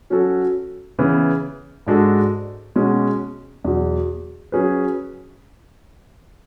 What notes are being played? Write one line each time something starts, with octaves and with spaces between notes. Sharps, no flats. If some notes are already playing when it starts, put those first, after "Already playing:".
F#3 C#4 F#4 A4
C#3 E3 B3
G#2 G#3 D4 F#4 A4
B2 G#3 C#4 F#4
E2 B2 F#3
F#3 C#4 G#4 B4